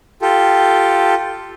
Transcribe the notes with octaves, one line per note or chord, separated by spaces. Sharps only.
F4 G4 A4